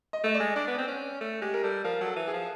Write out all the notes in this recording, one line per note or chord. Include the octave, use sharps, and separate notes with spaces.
D#5
A3 D#5
D5
G#3
D4 D5
B3
C4
C#4
A3
G#3 G4
A#4
G3 A4
F3 A#4
F#3
A4
E3
G#4
F3